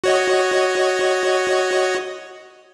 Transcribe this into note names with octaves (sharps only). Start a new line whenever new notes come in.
F#4 C#5 D#5